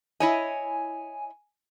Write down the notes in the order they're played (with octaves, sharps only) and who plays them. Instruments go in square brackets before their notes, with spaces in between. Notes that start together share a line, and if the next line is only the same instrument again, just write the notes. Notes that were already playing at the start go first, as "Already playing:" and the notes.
[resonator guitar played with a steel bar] E4 C#5 D#5 [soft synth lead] G#5